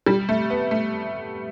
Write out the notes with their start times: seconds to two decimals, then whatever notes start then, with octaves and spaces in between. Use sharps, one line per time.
0.06 G3
0.29 A3
0.50 B3
0.71 A3